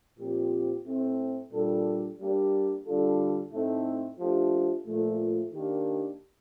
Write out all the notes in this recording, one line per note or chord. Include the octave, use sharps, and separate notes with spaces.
A#2 F3 C4 G4
A2 A3 C4
A#2 G3 D4 A4
G3 A#3 D4 G4
D3 G3 D4 F4 A4
A2 A3 C4 D#4 A4
F3 A3 D4 G4
A#2 F3 A3
D#3 A#3 D4 G4